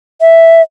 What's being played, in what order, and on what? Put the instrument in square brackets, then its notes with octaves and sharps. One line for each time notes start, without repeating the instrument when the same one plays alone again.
[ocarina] E5